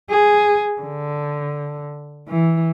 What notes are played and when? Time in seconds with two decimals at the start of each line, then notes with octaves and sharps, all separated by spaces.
0.11 G#4
0.81 D3
2.28 E3